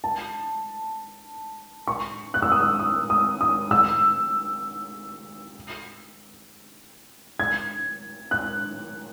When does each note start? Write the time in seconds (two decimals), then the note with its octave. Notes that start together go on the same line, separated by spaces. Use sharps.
0.04 A5
1.87 C#6
2.34 F#6
2.42 E6
2.52 D#6
2.60 E6
2.79 D#6
3.10 D#6
3.41 D#6
3.71 E6
7.40 G#6
8.31 F#6